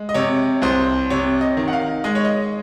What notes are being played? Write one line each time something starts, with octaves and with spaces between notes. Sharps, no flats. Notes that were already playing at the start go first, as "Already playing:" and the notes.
Already playing: G#3
D#5
C3 C#5
C2 C5
C3 C#5
D#5
D#3
F#5
F5
G#3 D#5
C#5
D#5